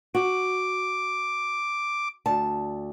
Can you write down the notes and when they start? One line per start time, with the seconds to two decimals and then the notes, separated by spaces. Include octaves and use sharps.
0.15 F#4 D6
2.26 D2 A5